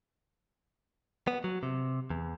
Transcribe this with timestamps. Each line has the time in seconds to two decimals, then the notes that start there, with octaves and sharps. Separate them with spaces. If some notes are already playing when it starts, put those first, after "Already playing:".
1.27 B3
1.44 F#3
1.63 C3
2.10 E2